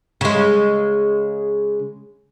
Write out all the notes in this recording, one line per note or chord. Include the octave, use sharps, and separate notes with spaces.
C#3 G#3